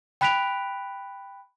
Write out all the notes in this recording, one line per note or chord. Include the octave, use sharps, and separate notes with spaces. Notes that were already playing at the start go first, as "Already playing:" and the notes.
G5 B5 F#6 B6 D7 F7